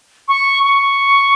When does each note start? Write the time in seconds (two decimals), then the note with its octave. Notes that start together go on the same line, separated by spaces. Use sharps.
0.28 C#6
0.63 C#6